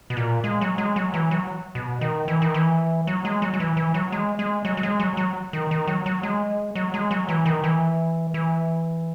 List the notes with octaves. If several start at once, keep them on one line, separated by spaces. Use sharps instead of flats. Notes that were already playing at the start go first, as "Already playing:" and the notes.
B2
A#2
G#3
F#3
G#3
F#3
E3
F#3
B2
D#3
E3
D#3
E3
F#3
G#3
F#3
F#3
E3
E3
F#3
G#3
G#3
F#3
F#3
G#3
F#3
F#3
D#3
D#3
F#3
F#3
G#3
F#3
G#3
F#3
E3
D#3
E3
E3